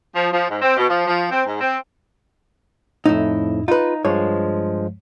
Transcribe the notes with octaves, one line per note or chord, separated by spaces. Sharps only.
F3
F3
G#2
C4
B2
F3
F3
C4
G#2
C4
F2 A2 D#4 E4
D#4 F4 B4
G2 F3 G#3 C#5